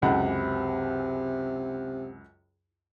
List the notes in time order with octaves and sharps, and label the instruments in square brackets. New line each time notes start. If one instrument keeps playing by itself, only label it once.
[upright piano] C#2 F#2 F#5 [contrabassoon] C3